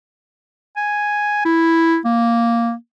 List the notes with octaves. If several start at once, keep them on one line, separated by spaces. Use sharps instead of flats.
G#5
E4
A#3